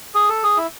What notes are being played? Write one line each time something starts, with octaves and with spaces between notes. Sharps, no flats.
G#4
A4
G#4
E4